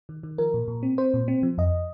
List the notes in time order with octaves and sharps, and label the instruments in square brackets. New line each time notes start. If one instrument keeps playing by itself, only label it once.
[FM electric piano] D#3
D#3
F3 A#4
A#2
A#2
C4
C4 C5
A#2
C4
F3
F2 D#5